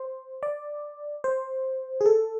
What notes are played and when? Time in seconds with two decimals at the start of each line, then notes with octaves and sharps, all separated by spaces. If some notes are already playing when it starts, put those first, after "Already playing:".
Already playing: C5
0.43 D5
1.24 C5
2.01 G#4
2.06 A4